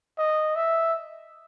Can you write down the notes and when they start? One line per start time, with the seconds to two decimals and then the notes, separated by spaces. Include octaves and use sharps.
0.18 D#5
0.56 E5